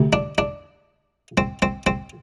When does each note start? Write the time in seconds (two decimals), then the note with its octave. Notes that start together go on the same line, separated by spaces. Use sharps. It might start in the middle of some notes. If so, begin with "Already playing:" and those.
Already playing: D2 C3
0.13 D4
0.38 D4
1.38 C4
1.62 C4
1.87 C4